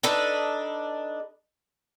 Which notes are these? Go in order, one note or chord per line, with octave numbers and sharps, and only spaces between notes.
D4 D#4 A4 B4